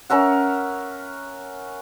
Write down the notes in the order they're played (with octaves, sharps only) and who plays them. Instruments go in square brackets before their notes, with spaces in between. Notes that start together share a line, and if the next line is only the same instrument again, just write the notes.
[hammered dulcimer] C#4 A#4 E5 F#5